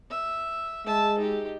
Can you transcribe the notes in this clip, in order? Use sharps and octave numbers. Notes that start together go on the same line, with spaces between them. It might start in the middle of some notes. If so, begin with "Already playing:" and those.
E5
G#3 E5 A5
D#4 G4